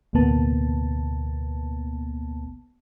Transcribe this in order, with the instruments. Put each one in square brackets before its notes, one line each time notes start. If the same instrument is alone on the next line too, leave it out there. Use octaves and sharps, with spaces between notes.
[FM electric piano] A1 D2 B2 A#3 B3 A5